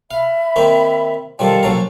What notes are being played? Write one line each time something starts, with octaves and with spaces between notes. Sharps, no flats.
E5 F5 B5
D#3 A#3 C4
D#3 F3 G3 A4 F5 A5
A#1 F#3 A#5